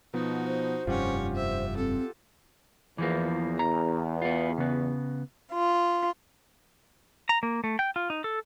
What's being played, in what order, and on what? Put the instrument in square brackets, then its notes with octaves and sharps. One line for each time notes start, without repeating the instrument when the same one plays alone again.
[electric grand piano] B2 F3 B3 [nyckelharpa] D#4 F#4
[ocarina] C5
[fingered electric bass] F1 G2 [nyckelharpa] C#4 C#5 [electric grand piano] F4 G4 F#5
[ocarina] C5 [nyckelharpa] E5
[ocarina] C4 [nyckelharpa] A4
[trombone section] E2 [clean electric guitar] E3 F3 A#3
[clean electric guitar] A#5
B3 F4
C#3 B3
[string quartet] F4
[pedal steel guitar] A#5
A#3
A3
G5
F4
D#4
A4